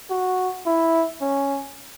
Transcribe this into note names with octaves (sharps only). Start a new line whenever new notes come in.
F#4
E4
C#4